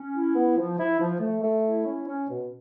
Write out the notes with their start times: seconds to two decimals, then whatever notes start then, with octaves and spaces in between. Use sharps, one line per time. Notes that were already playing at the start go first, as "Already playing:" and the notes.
Already playing: C#4
0.14 E4
0.35 B3
0.57 F3
0.79 E4
1.00 F3
1.21 A3
1.43 A3
1.65 E4
1.86 C#4
2.08 C#4
2.29 B2